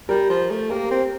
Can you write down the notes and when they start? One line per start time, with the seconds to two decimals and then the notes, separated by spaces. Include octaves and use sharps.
0.09 G3 G4 A#4
0.29 F3
0.50 A3
0.70 A#3 G4 A#4
0.91 C4